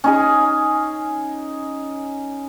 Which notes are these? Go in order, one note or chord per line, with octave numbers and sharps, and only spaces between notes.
C#4 D#4 G#4